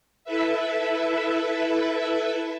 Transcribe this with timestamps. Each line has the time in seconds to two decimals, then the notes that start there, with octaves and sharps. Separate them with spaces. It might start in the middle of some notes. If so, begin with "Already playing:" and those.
0.24 E4 A4 B4 E5